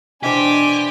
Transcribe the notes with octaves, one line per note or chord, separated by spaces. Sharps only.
B2 E3 D4 G4 C5 G#5 D6